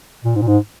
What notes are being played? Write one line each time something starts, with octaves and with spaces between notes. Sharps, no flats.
A#2
G#2
A#2
G#2